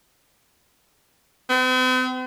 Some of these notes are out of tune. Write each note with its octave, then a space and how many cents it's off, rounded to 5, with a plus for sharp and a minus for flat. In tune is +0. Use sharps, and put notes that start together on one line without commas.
C4 -45